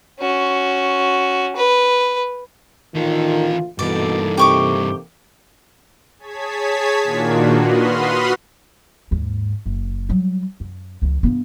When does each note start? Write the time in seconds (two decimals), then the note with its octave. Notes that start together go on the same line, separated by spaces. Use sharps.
0.19 C#4 F#4
1.56 B4
2.95 D2 A#2 D#3 E3 F4 A4
3.79 G2 B2 E3 A#3 D#4 A4 D5
4.37 C3 G4 C#6 D6
6.19 G#4 C#5 A5 G#6 B6
7.03 A#2 D#3 A#3 D4 F4 F#4
7.56 F#4 B4 B5 C6 D#6 F6
9.11 D#2 G#2
9.66 F#1
10.09 F#3 G3
10.60 F#2
11.02 C#2 E3
11.23 G2 B3